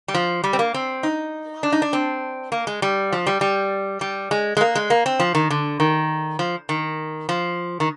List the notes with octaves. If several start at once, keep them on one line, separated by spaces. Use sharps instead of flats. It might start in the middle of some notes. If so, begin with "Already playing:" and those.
G3
F3
G3
C4
A#3
C4
D#4
D4
D#4
D4
C4
A#3
G#3
G3
F3
G3
G3
G3
G#3
G#3
A#3
G#3
A#3
C4
F3
D#3
D3
D#3
F3
D#3
F3
D#3